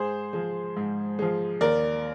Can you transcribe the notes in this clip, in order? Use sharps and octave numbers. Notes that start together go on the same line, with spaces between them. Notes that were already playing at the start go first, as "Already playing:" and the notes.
Already playing: G#2 G#4 C5
F3 G#3
G#2
F3 G#3
D#2 A#4 D5